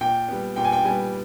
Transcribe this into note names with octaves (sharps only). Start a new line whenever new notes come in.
A#2 G5
G3 B3
A#2 G5
G#5
G5
G3 B3 G#5